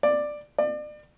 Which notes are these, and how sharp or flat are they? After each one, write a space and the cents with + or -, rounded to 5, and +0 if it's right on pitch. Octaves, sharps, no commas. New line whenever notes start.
D5 +10
D5 +35